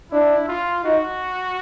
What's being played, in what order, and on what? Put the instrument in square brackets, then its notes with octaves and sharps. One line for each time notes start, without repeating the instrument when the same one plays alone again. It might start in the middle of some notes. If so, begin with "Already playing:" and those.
[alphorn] D4 [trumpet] E4
[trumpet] F4
[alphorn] D#4 [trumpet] F#4